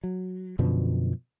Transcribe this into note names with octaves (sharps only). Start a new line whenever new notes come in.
F#3
F#2 B2 D3 F3